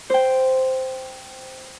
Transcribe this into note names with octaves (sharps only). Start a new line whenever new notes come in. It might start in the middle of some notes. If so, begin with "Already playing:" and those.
C5 G5